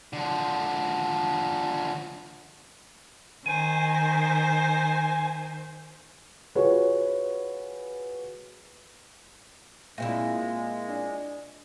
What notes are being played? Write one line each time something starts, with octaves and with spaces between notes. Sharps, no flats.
D3 F3
D#3 C5 G#5
F4 F#4 G#4 B4 C#5
A#2 G#3 C4 E4 E5 F5 A#6
D4 D5